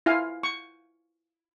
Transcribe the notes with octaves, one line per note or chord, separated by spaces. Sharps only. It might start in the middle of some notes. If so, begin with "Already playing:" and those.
E4 F4 F5 G#5
C#6